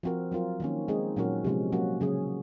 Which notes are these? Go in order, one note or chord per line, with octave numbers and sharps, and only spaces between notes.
F3 C4 F#4 A#4
F#3 C4 F4 A#4
D#3 A#3 C#4
G#3 C4 D#4 G#4
A#2 F#3 C#4 F#4 A#4
C3 F3 G#3 C#4
F#3 A#3 C#4 F#4
C#3 F#3 C#4 G#4